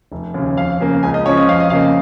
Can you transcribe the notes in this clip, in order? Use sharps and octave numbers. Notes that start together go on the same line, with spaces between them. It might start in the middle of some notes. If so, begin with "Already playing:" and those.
F1
D#2 C#3
F2 F5
C#3 A#3
C#2 G#5
D#5
C#3 F3 C#4 C#5
D#5
F2 F5
D#5
C#3 A#3 F5